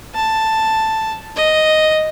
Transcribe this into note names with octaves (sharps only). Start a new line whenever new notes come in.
A5
D#5